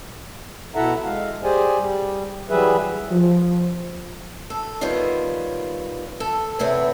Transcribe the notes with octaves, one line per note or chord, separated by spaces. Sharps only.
B2 E4 A4 E5 F#5 A#5
G#3 F5
G4 G#4 C5 D5 G#5
G3
E3 F#3 G3 G#4 B4 E5
F3
A4
D#3 G3 B3 F4 C#5
A4
E2 C3 B3 C4 C#5